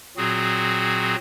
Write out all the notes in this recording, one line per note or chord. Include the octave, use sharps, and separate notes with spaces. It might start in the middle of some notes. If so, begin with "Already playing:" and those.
A#2 F#3 C4 F#4 G#4